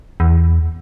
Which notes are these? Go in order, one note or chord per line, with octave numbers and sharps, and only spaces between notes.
E2